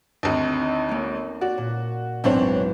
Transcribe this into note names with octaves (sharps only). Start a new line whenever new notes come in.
G#1 D2
D#4
A#3 C#4
F#4 D5
A#2
B1 E2 G#2 C4 D4 C#5